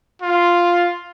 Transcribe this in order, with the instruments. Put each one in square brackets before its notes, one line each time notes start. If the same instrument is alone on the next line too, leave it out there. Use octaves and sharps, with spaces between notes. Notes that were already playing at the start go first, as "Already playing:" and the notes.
[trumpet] F4